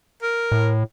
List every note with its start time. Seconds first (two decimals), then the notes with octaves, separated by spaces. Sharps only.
0.23 A#4
0.52 A2